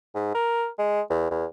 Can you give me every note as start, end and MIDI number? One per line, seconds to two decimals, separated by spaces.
0.15 0.33 44
0.34 0.67 70
0.78 1.01 56
1.10 1.26 40
1.31 1.45 40